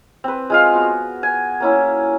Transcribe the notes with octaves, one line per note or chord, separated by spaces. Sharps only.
C4 B4
G#3 F4 F5
B3 F#4
G#5
A#3 C#4 E4